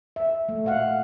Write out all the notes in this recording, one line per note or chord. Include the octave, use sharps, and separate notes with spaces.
E5
A3
A#2 F5 F#5